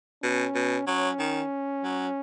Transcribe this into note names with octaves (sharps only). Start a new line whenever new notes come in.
B2 C#4
B2
F#3 C#4
D#3
F#3